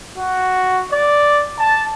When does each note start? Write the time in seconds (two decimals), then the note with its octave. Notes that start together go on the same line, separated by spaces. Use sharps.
0.17 F#4
0.91 D5
1.58 A5